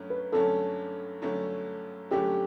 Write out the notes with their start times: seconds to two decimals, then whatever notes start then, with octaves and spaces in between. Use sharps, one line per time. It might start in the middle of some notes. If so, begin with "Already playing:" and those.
Already playing: G2 F#3 A3 C#4
0.10 B4
0.32 G2 D3 F#3 A3 C#4 A4
1.22 G2 D3 F#3 A3 C#4
2.11 G2 D3 F#3 A3 C#4 G4